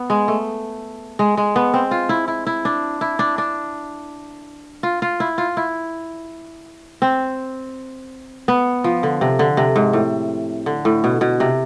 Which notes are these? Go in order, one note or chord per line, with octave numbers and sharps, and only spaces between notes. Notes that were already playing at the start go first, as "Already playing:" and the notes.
Already playing: B3
G#3
A3
G#3
G#3
B3
C4
F4
E4
E4
E4
D4
E4
D4
D4
F4
F4
E4
F4
E4
C4
B3
F3
D3
C3
D3
C3
G#2
A2
D3
A2
B2
B2
C3